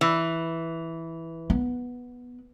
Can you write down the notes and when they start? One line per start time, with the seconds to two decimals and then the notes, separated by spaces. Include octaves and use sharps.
0.01 E3
1.50 B3